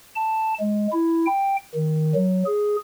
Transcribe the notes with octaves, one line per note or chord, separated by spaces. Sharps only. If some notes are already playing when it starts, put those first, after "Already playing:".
A5
G#3
E4
G5
D#3
F#3
G#4